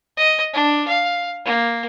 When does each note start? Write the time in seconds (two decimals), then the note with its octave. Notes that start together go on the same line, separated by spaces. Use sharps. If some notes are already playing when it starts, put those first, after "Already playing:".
0.17 D#5
0.54 D4
0.88 F5
1.45 A#3